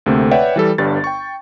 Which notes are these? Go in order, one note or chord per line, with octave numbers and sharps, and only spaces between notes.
D2 C3 A3 A#3 C4
B4 C#5 D5 E5 F#5 G5
E3 G3 A4
G1 G2 G3 A6
G5 C#6